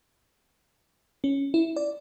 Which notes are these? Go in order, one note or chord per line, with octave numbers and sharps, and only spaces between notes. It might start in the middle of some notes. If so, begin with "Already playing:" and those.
C#4
E4
D5